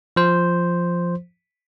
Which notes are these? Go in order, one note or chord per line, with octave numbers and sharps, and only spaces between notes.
F3 C5